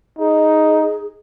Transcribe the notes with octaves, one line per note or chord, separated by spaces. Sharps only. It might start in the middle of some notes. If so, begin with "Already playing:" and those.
D#4 G#4